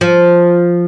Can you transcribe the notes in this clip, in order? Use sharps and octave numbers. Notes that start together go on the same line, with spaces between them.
F3